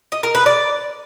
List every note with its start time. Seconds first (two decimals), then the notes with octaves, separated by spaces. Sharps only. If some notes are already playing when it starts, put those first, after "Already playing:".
0.12 D#5
0.23 A#4
0.35 B4
0.46 D5